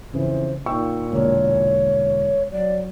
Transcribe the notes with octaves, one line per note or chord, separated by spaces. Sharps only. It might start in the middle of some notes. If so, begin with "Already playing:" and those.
F2 C#3 E3 C5
A#2 D#4 G5 C#6 E6
E1 D3 A#3 C#5
F#3 D5